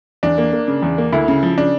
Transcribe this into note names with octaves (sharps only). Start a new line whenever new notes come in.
E2 D4
A#3
A#3
C#3
E2
A#3
D2 E4
C#3
F3
C#3 D4